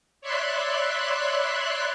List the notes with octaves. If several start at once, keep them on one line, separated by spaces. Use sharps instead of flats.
C#5 D5 E5 B5 C6 F#6